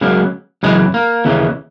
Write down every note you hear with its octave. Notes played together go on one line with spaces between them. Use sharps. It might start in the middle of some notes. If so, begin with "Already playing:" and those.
C#2 C#3 F#3 A#3
F#2 C#3 E3 G#3
A#3
D#2 C#3 E3